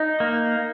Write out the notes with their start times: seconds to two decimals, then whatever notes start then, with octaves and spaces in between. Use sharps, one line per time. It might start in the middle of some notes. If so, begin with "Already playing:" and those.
Already playing: D#4
0.20 A#3